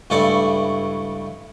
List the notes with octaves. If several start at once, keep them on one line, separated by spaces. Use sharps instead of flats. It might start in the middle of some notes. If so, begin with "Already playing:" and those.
C#2 G2 A3 E4 D5 C#6